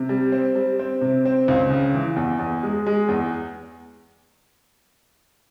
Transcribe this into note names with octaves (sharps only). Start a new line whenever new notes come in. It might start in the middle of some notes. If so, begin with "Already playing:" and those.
Already playing: C3
G3
C4
G3
C4
C3
C4
C#2
C#3
E3
E2
E2
G#3
G#3
E2